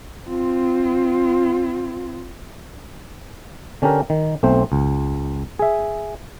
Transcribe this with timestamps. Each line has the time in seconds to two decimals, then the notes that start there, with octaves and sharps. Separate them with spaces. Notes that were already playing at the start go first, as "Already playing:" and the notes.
0.27 C4 F4
3.82 D3 C#4 D4 G4 A#4
4.10 D#3
4.43 B1 A3 C4 C5
4.72 C#2
5.59 G#4 E5